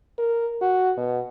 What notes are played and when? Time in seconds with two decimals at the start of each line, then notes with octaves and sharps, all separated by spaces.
0.19 A#4
0.62 F#4
0.97 B2